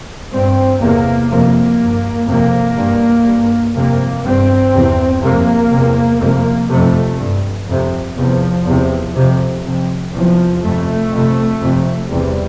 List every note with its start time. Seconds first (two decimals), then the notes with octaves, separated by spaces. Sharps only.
0.31 G2 C4
0.80 E2 C3 A#3
1.29 F2 C3 A#3
1.79 G2
2.28 F2 C3 A#3
2.76 G2
3.25 G2
3.75 F2 C3 A#3
4.23 G2 C4
4.73 E2 C3
5.23 F2 C3 A#3
5.71 E2 C3
6.20 F2 C3 A#3
6.69 F2 C3 A3
7.18 G2
7.67 F2 C3
8.16 E2 C3 F3
8.65 E2 C3
9.14 F2 C3
9.64 F2 C3
10.12 E2 C3 F3
10.62 F2 C3 A3
11.11 F2 C3
11.60 F2 C3
12.08 E2 C3 G3